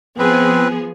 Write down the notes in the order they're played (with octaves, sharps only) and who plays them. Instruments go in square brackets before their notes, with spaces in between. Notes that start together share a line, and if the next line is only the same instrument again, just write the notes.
[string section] F3 B3 G#4 [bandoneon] C4 B4